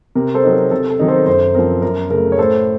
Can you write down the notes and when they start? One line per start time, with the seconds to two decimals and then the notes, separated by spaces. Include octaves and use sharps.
0.15 C3 A#4
0.34 A4 C5
0.44 F#3 C4 D#4
0.52 A#4
0.71 C3 A4
0.90 A4
0.99 D#3 F#3 C4 D#4
1.08 A4 C5
1.26 F#2 A4 C5
1.55 F3 C4 A#4
1.82 F#2 A#4
2.10 C#3 A3 A#4
2.32 C#5
2.38 A2 A4 C5